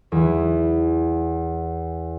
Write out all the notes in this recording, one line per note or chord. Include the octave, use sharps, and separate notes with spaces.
E2 E3